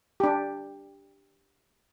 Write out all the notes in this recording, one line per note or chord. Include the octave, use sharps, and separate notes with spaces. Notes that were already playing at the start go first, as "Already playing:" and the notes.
D4 G4